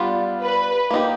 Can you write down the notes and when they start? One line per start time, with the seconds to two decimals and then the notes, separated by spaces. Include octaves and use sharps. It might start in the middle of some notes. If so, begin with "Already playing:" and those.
Already playing: G3 B3 D4 F4
0.42 B4
0.90 A#3 D#4 G4